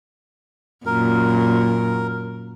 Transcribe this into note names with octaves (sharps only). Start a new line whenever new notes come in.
F#2 A#2 A#4